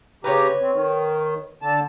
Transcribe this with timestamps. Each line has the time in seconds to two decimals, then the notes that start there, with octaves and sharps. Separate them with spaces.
0.24 C#3 G4 B4 C#5 A#5
0.62 C4
0.73 D#3
1.62 D3 A5